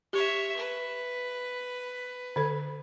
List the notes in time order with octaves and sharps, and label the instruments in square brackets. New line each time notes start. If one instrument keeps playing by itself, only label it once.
[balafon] G4 [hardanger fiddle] C#5 E5
[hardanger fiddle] B4
[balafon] D3 A4